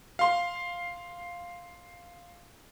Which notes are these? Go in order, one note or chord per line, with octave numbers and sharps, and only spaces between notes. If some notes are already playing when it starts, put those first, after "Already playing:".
F5 C6